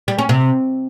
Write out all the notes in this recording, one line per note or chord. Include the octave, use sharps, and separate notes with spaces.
G3
C#4
C3